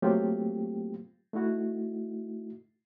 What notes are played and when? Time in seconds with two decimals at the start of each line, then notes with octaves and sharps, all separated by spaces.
0.02 F#3 A3 A#3 C4 F4 G4
1.33 A3 D#4 E4 F#4